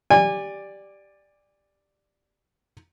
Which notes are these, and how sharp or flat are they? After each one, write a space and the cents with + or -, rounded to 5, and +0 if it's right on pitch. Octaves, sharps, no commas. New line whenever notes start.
G4 +0 D5 +5 G#5 -30